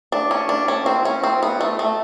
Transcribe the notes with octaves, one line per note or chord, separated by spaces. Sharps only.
D4
C#4
D4
C#4
C4
C#4
C4
B3
A3
A3